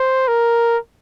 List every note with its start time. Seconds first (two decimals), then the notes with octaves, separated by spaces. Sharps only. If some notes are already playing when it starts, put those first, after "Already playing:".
Already playing: C5
0.28 A#4